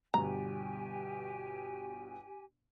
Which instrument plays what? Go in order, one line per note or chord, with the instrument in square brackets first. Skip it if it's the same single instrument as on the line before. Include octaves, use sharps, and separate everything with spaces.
[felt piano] G1 G2 B2 [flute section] G4 G#5 [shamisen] A#5